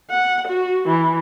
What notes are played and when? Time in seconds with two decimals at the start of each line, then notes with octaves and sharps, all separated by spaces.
0.10 F#5
0.48 F#4
0.88 E3